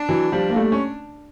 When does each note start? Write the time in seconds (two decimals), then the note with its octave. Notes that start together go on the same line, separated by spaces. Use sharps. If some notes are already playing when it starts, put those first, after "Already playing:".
Already playing: D4
0.09 E3 F#3
0.32 F3 G3
0.50 A#3
0.56 G3 A3
0.72 C#4